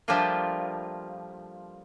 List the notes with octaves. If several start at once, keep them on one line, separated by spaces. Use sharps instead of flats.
F3 G3 A3 A#3 D4 F4